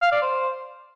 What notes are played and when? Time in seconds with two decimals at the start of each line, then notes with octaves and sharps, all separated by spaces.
0.02 F5
0.12 D5
0.22 C5